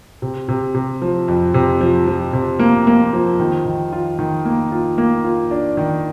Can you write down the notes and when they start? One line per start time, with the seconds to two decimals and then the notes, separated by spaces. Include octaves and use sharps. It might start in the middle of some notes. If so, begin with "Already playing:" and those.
0.22 C3
0.48 C3
0.74 C3
1.02 F3
1.28 F2
1.54 C3
1.81 F3
2.07 F3
2.33 C3
2.59 A#3
2.87 A#3
3.13 F3
3.40 D#3
3.66 D#3
3.93 F4
4.19 D#3
4.45 A#3
4.72 F4
4.98 A#3
5.24 F4
5.51 D4
5.77 D#3